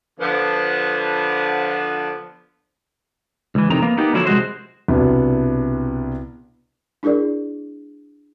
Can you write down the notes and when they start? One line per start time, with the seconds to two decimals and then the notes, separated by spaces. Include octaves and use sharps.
0.20 D3 F3 B3
3.55 C#2 E3
3.70 F2 C3 D#3 A#5
3.82 A#3 B3
3.97 A#3 B3 D#4 G4
4.14 D3 F3 F#3 C#4 E4
4.26 C2 G#3 F#4 C5
4.88 C2 B2 B3 D4 E4
7.03 D4 E4 G#4 A#4 D5